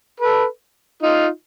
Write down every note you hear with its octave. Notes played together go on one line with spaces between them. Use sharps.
A4 B4
D#4 F4